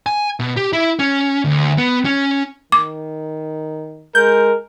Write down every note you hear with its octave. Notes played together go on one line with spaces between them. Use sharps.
G#5
B2
G4
E4
C#4
D2
B3
C#4
D#3 D6
G#3 A#4 G6